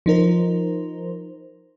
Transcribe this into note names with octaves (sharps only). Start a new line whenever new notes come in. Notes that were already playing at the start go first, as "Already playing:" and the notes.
F3 D#4 A#4 C5